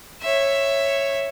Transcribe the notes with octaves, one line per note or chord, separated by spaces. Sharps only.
C#5 E5